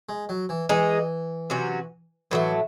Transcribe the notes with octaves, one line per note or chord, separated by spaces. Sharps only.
G#3
F#3
E3
E3 G#3 D#4 G#4
C3 F#3 C#4 F#4
A2 E3 F#3 A3